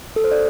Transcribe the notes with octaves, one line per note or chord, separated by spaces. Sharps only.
A4
C5
D5